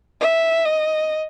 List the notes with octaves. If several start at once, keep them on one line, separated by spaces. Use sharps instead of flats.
E5
D#5